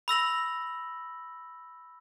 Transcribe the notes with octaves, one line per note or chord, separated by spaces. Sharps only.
B5 E6 A#6 F#7